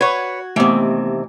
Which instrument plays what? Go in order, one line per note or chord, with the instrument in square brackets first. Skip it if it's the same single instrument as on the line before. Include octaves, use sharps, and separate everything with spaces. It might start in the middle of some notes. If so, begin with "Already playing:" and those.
[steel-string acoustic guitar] F#4 [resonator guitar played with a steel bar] B4 C#5 [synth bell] G#6
[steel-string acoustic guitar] D#2 C3 [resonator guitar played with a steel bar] E3 [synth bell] A3 B3